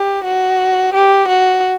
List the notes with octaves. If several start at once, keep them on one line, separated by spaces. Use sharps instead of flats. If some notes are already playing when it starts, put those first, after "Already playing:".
Already playing: G4
F#4
G4
F#4